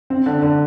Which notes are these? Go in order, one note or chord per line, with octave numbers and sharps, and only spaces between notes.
C4
D3
D3